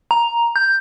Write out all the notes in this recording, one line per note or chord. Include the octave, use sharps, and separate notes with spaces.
A#5
G6